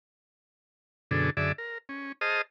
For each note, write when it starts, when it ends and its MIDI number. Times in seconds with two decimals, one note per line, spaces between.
1.11 1.30 42
1.11 1.30 47
1.11 1.30 50
1.11 1.30 62
1.11 1.30 68
1.11 1.30 69
1.37 1.52 42
1.37 1.52 50
1.37 1.52 68
1.37 1.52 74
1.37 1.52 76
1.58 1.78 70
1.89 2.12 61
2.21 2.42 68
2.21 2.42 72
2.21 2.42 75
2.21 2.42 81
2.21 2.42 87
2.21 2.42 89